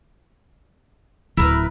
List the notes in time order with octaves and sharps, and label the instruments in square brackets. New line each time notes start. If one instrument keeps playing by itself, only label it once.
[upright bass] D1 D2 [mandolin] E4 A#4 B4